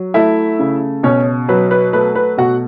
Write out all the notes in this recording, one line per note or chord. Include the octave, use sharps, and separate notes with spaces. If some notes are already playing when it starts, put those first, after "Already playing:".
Already playing: F#3
A3 E4 E5
C#3
B2 C#4 C#5
F#3 B4
B4
A3 B4
B4
B2 F#4 F#5